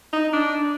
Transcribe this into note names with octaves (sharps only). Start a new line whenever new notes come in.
D#4
D4